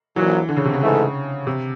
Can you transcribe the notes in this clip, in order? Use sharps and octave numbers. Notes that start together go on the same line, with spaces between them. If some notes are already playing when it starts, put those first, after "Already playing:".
A#1 A#2 E3 F#3
D3
C#3
C3
C#3
G#2 E3 A3
C3